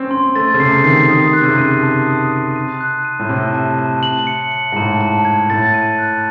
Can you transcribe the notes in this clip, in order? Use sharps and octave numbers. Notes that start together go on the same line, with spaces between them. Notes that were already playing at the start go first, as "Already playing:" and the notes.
Already playing: C4 C#4
C4 C6
A3 A6
C#3
C3 C7
D#3 C7
D#3 D#6
F#6
C3
C#3
D#7
A5
D#6
F#6
D#7
F#6
D#7
A2
C3 A5
A5
A5
F#7
C#7
C#7
G#2
A2 A5
A5
G#6
A2 A6
D#7
F#6